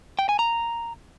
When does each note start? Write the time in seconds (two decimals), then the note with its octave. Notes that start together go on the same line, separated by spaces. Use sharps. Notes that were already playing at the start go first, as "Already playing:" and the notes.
0.19 G5
0.29 G#5
0.39 A#5